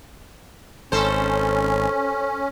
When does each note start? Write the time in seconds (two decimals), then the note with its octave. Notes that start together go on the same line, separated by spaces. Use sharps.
0.92 G#1 C#4 A4 C5